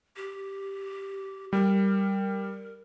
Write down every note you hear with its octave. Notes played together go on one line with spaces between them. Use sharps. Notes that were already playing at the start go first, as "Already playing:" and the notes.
G4
G3 A#4